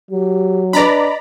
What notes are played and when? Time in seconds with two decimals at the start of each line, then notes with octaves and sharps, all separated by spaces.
0.11 F#3 G4
0.73 D4 B4 D5 D#5 A#5 B5